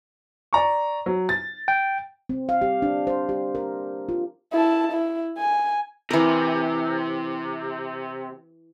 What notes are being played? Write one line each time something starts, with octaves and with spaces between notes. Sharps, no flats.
D5 A#5 C#6
F#3
A6
G5
C4
F5
G4
D4
C5
G4
A#4
F4
E4 A5
E4
G#5
C3 E3 A#4